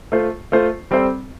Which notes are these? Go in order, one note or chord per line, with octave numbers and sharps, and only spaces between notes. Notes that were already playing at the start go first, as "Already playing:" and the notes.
A3 F4 C5
A3 F4 C5
G3 C4 A4 C5